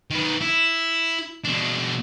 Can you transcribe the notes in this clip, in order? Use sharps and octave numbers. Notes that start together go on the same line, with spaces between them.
D#3 B4
E4
B2 D4